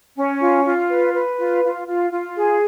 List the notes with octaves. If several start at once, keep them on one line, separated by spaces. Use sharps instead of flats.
C#4
F4
F4
B4
B4
F4
F4
F4
F4
G#4